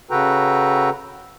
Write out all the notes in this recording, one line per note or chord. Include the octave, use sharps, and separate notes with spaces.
C#3 F#4 A4 B4 G5 A#5